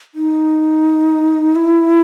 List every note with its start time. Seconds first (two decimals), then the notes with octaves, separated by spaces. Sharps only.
0.15 D#4
1.56 E4